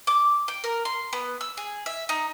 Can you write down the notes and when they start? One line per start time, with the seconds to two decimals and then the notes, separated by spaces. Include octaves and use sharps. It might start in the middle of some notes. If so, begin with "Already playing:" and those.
0.07 D6
0.48 G5
0.64 A#4
0.85 C6
1.13 B3
1.41 E6
1.57 G#4
1.86 E5
2.09 D#4